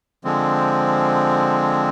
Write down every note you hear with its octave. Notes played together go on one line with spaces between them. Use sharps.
D3 F3 G#3 C4